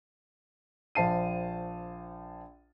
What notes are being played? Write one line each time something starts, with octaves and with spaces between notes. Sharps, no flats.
A#1 C5 F5 A5 C7 D#7